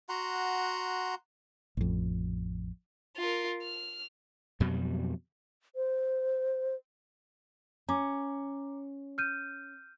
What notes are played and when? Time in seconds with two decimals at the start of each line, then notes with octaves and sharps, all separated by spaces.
0.09 F#4 F#5 A#5 C6
1.77 A1 F2
3.17 F4 A#4
3.63 F6
4.60 F2 B2 F#3 G3
5.76 C5
7.89 C#4 A#5 D6
9.18 F6 G6 D#7